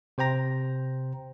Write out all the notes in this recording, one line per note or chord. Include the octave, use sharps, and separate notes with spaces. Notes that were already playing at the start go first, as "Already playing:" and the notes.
C3 C5 G5 A#5 A#6